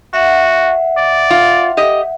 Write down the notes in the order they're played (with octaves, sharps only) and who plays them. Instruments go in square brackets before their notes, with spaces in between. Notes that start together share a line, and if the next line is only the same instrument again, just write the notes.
[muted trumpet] F#4 [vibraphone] E5 F#5
[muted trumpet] D5
[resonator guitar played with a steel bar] F4
G4 D#5